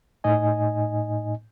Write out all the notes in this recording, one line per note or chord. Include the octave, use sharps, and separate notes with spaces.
A2 D#4 D#5 G#5